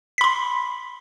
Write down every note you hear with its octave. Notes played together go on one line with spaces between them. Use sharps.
B5 C6 B6